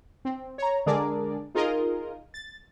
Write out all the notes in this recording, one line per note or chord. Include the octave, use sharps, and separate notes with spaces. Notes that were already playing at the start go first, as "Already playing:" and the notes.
C4
C#5 A#5
D3 G#3 D4 G#4 A#4 D5
D#4 F4 G#4 A#4 D#5
A6